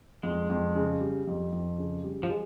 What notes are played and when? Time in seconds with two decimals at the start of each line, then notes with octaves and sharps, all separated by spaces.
0.23 F2 G#3
0.50 F2
0.75 C#3
1.01 G3
1.27 F2
1.52 F2
1.78 C#3
2.04 G3
2.23 F3
2.30 G#3